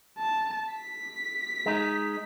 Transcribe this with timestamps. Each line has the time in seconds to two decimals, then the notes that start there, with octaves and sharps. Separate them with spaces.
0.19 A5
0.74 B6
1.66 G#3 D#4